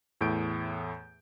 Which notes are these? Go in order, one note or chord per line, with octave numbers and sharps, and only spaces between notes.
E2 A2 G6 D7